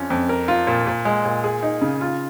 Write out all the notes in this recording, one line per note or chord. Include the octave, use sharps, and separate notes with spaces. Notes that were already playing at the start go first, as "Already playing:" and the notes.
Already playing: F2 C#4 F4
F2
A#4
F4
A#2
A#2
G#3
A#2
G#4
D#4
C#3
F4